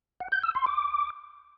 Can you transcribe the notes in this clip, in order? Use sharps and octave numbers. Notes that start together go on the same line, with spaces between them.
F#5
G6
E6
C6
D6